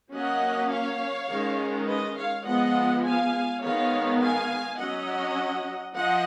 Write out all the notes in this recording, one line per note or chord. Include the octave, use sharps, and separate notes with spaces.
F#3 A#3 C#4 D#5 F#5
C#5 F5
D#3 G#3 C#4
B4 D#5
C#5 F5
F3 G#3 B3 D#5 F#5
F5 G#5
D#3 G#3 B3 C#5 F5
F5 G#5
F#3 C#4 D#5 F#5
F3 D#5 F#5